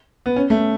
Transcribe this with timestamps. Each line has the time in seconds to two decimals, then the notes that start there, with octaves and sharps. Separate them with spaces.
0.26 B3
0.36 C#4
0.50 A3